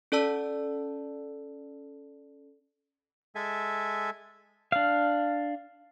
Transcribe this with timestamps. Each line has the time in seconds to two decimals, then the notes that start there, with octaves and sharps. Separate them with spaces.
0.12 C#4 A4 D5 A5 E6
3.35 G#3 A4 E5 G#5
4.72 D4 F5